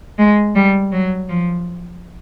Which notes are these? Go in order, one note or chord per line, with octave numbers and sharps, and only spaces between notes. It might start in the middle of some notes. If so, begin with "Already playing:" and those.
G#3
G3
F#3
F3